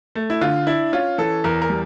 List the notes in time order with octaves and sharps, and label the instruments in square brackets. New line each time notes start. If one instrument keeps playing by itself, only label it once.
[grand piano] A3
E4
D3 F4
D4 E4
C#4 F4
E3 A4
E2 A#4
A#4
G3